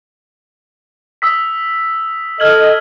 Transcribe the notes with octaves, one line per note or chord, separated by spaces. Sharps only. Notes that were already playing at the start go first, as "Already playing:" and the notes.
D#6 E6 B6
A4 D#5 F6 G#6 F#7